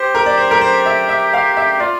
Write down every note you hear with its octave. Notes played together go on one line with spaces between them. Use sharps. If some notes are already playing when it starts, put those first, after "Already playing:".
Already playing: G4 C5
A#4
D5
C5
A#4
C5
E5
E5
F5
E5
F4 D5